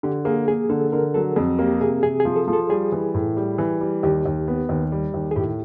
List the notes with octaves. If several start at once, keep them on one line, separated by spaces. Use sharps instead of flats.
D3 G4
A#3 G#4
A#3 G#4
D3 A4
D3 A#4
F#3 A4
F2 G#4
A#3 G4
C3 G#4
C3 G#4
G#4
F3
A4
F3
A4
G3 G#4
E3
A2
G3
E3
G3
D#2 G4
D#2
B3
D#2
G3
D#2
G#4
A2 G4